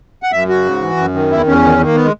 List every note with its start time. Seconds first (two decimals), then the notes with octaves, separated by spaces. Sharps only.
0.23 F#5
0.32 F#2 E5
0.49 C#3 F#4
0.65 G#2
0.80 E3
0.97 F#2
1.14 D#3
1.31 E2 E4
1.46 E2 C#4
1.64 D#3
1.79 D#3
1.84 A#3
1.95 B3
2.04 G#3